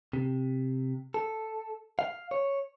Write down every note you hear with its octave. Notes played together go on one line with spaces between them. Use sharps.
C3
A4
F5
C#5